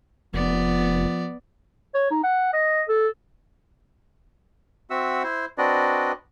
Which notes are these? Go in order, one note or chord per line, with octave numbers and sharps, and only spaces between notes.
F1 F3 B3 D5
C#5
D#4
F#5
D#5
A4
C4 F#4 E5 F#5 E6
E4 C5
C4 D4 F#4 B4 D5 D#5